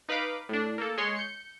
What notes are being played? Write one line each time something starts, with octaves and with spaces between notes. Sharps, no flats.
D#4 B4 F5 B5 D6
A2 D4
A#3 A4
G#3 C#5 C6
G6 C#7